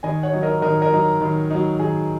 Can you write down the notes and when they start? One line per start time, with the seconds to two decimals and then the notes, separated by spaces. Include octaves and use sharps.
0.03 D#3 D#5 G#5
0.23 C#5 F#5
0.33 F#3 D#4
0.43 A#4 D#5
0.62 D#3 A#4 D#5
0.82 A#4 D#5
0.92 F#3 D#4
1.21 D#3
1.51 F#3 D#4
1.79 D#3 G#4